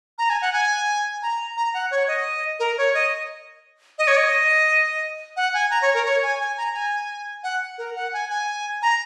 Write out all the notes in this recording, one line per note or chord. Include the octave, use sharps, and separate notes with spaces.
A#5
G#5
F#5
G#5
A#5
A#5
F#5
C#5
D#5
A#4
C#5
D#5
D#5
C#5
D#5
F#5
G#5
A#5
C#5
A#4
C#5
G#5
G#5
A#5
G#5
F#5
A#4
F#5
G#5
G#5
A#5